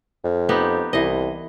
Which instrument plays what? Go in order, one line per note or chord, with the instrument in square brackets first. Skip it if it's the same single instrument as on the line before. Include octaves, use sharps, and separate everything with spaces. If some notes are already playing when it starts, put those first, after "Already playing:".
[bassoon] F2
[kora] B3 D#4 G4
[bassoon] C2 [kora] E3 D#5